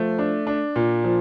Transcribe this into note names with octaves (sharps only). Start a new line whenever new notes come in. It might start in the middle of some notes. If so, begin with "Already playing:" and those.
Already playing: F3 A3
D4
D4
A#2
F3